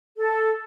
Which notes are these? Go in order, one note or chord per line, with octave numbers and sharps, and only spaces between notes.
A4